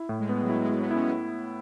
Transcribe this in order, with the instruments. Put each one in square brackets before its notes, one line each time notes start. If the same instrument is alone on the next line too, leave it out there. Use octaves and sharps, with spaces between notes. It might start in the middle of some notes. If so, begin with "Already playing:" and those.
Already playing: [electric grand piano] E4
A2
[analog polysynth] G#3
[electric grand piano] B3
[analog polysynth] F#3
[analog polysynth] G#3 [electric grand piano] E4
[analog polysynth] G#3
[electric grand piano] E4
[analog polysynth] B3
[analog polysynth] C#4 [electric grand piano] E4
[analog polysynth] C#4